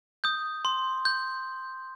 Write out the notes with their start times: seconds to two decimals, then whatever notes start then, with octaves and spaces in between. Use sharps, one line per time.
0.24 D#6 G6
0.65 C6
1.05 G6